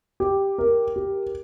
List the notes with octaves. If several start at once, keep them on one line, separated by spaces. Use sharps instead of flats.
G4
A#4
G4